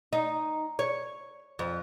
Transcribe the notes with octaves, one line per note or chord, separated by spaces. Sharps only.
D#4
C#5
F2